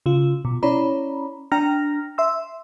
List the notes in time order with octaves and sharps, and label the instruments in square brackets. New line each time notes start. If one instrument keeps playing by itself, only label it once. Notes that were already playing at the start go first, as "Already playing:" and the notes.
[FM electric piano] C#3 F4
B2
C#4 E4 C#5 D5 A#5 B5
D4 G5 A#5 F6 A#6
E5 C6 E6